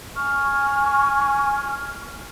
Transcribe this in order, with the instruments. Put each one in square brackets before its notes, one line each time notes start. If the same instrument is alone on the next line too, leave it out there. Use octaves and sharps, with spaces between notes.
[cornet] G#5 [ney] C#6 [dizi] F6